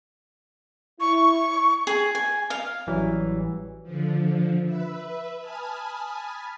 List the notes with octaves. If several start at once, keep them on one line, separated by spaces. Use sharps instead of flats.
E4 C#6
G#4
G#5
F5
A1 E3 F#3 G3
D3 F3
B4 E5
G#5 A5 B5 D#6 F6